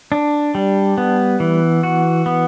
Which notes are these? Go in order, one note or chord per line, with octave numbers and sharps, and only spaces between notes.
D4
G3
B3
E3
F#4
B3